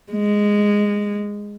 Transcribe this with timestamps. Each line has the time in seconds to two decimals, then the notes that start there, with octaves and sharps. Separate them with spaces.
0.12 G#3